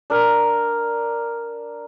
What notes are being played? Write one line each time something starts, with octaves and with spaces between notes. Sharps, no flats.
D4 A#4